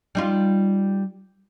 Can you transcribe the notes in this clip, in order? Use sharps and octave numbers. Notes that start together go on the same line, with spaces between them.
G3 D#4 F4